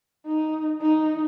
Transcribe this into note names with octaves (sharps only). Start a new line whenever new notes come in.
D#4
D#4